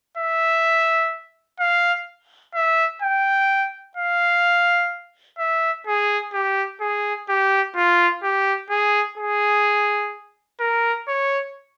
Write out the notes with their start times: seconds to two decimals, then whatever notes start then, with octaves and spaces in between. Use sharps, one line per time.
0.18 E5
1.60 F5
2.55 E5
3.02 G5
3.97 F5
5.39 E5
5.87 G#4
6.34 G4
6.81 G#4
7.29 G4
7.76 F4
8.23 G4
8.71 G#4
9.18 G#4
10.61 A#4
11.08 C#5